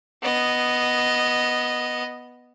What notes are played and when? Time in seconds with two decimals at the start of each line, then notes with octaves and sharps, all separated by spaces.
0.23 B3 D#5